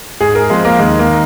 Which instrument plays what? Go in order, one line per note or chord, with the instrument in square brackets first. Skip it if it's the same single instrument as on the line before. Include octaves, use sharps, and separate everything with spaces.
[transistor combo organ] G#2 [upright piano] G#4
[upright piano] A#4
[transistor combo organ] F3 C4 [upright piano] G#3
[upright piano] A#3
[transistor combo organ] D#2 [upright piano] G#3
[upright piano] A#3
[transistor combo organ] D#3